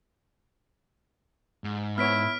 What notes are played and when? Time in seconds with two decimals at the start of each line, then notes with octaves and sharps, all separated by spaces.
1.64 G#2
1.98 B3 E4 C#5 F6 B6 D7